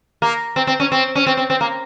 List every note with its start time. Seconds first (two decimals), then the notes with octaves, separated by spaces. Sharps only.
0.22 A#3
0.56 C4
0.67 C4
0.80 C#4
0.92 C4
1.15 C#4
1.27 C4
1.37 C4
1.50 C4
1.61 A#3